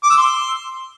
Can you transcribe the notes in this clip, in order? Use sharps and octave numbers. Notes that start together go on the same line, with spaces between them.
D6
E6
C6